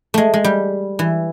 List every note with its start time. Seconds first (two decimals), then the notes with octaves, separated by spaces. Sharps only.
0.14 G#3 A3
0.34 G#3
0.44 G3
0.99 E3